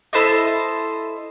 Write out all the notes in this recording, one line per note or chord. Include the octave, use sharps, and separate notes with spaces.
E4 A4 C5 D#5